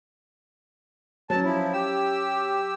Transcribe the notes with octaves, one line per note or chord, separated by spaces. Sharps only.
F#3 C#4 A5
F3 E4
G4 E6